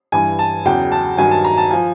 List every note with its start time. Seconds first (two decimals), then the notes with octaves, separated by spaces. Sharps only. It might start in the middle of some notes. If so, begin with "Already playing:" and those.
0.12 G2 E3 G#5
0.39 A5
0.65 E2 C#3 F#3 G5
0.92 A5
1.18 G2 D#3 F#3 G#5
1.31 A5
1.45 A#5
1.57 A5
1.71 F3 G#5